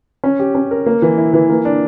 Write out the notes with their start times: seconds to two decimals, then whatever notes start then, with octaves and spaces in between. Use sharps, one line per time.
0.24 C#4
0.39 G4
0.55 C#4
0.71 A#4
0.86 A#3
1.02 E3
1.18 E4
1.34 E3
1.49 A#3
1.65 D4